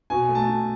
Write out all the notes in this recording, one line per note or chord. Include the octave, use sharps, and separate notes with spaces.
B2 G#5
A3
A5
B2